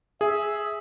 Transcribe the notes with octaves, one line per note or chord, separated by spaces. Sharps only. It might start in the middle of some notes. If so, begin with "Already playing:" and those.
G#4 E5